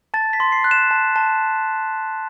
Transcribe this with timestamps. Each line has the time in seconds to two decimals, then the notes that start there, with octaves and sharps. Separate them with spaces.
0.14 A5 A6
0.33 B6
0.40 C6
0.52 C7
0.64 F#6
0.71 E7
0.91 A5
1.16 A5